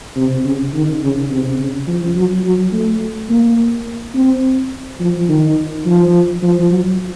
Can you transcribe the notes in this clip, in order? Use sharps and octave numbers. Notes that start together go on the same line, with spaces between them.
C3
C#3
D#3
C#3
C3
C#3
F3
F#3
F#3
A3
A#3
C4
F3
D#3
F3
F3
F#3